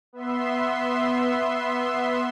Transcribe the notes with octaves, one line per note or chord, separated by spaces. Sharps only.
B3 E5 C6